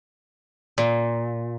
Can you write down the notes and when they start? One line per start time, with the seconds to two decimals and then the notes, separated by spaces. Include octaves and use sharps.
0.78 A#2